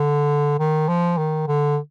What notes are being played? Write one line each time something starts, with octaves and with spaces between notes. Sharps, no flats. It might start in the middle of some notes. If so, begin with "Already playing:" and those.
Already playing: D3
D#3
F3
D#3
D3